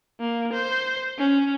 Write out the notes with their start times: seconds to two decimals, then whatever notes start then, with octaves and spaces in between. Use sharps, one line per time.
0.20 A#3
0.53 C5
1.18 C#4